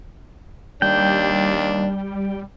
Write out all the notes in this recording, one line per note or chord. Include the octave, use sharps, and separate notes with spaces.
D#2 G3 D4 G5